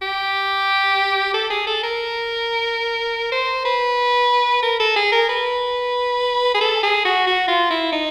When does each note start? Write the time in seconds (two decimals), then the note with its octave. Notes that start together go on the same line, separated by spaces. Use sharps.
0.02 G4
1.34 A4
1.50 G#4
1.67 A4
1.84 A#4
3.32 C5
3.65 B4
4.63 A#4
4.80 A4
4.96 G#4
5.12 A#4
5.29 B4
6.55 G#4
6.61 A4
6.83 G#4
7.05 F#4
7.27 F#4
7.48 F4
7.71 E4
7.93 D#4